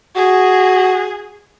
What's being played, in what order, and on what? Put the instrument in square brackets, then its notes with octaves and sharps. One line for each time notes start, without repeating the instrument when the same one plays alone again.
[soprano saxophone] F#4 [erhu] G#4